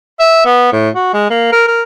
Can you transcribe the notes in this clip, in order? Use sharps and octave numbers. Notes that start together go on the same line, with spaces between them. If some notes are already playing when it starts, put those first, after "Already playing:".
E5
B3
A2
F#4
G#3
A#3
A#4
A#4